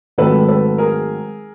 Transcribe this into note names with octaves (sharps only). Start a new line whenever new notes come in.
G#2 D#3 F#3 A3 C4 A4 B4
A4 B4
G#4 A#4